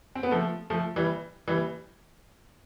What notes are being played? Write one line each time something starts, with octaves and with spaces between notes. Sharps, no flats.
C4
B3
F3 A3
F3 A3
E3 G3
E3 G3